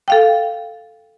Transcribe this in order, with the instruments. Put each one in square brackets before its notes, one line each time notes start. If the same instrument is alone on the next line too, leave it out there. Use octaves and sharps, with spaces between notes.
[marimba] A4 F5 G5